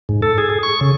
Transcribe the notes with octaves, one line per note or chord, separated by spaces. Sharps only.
G#2
A4
G#4
G#4
C#6
C#3